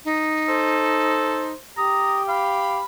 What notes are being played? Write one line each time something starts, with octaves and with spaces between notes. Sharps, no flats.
D#4
A4 C5
G4 A#5 D#6
F5 B5